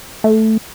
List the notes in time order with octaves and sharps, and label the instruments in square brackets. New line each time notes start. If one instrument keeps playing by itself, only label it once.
[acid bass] A3